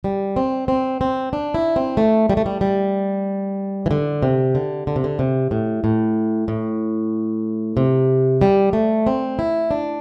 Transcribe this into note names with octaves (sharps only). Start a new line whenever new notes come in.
G3
C4
C4
C4
D4
E4
C4
A3
G3
A3
G3
G3
E3
D3
C3
D3
D3
C3
D3
C3
A2
A2
A2
C3
G3
A3
C4
E4
D4